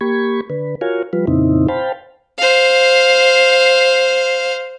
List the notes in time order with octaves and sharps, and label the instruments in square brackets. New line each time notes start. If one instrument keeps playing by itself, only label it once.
[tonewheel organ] A#3 G4 B5 C#6 G#6
D3 B4
F4 F#4 A#4 C#5 F5 G#5
F3 G3 F4 B4
F2 A#2 C#3 C4 D#4 E4
C5 F5 G5 A5 B5
[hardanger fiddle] C5 F5